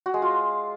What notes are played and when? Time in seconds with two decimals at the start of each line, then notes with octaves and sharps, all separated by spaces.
0.06 F#4
0.14 G#3
0.22 F4